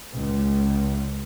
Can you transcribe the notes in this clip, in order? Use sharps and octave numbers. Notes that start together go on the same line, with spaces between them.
C#2